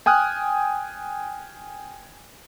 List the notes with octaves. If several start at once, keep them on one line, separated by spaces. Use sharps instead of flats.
G5 G#5 D#6 F6 F#6